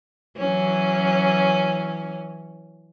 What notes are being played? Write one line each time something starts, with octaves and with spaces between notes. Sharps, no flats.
E3 F#3 C#4